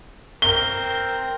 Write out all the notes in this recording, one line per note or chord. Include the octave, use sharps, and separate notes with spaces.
C4 A#4 G7